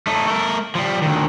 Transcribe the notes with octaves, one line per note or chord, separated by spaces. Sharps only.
A3 D#4
A3 A#4
F3 G3
D2 D#3